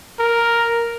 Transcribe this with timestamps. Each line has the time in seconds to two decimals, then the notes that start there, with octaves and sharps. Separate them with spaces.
0.19 A#4